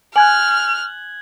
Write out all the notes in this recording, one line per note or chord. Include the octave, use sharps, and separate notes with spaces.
G#5 F6 F#6 G#6 F#7